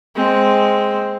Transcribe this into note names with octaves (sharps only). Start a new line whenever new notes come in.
G#3 C4